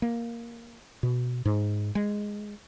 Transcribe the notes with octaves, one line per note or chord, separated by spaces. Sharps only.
A#3
B2
G#2
G#3